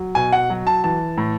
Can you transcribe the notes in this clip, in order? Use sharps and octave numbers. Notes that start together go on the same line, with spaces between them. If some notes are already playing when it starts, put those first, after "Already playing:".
Already playing: F#3
B2 G#5
F#5
F#3
A5
E3 A5
A2